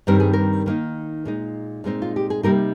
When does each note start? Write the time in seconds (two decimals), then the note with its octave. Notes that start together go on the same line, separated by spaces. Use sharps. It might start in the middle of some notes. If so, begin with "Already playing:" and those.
0.07 G2 D#3 G3 C4 A#4
0.20 G#4
0.33 A#4
0.66 D#3 A#3 D#4
1.25 A#2 G#3 D#4
1.84 A#2 G#3 C4 D#4
2.02 F4
2.16 G4
2.30 G#4
2.43 C3 G3 A#3 D#4 A#4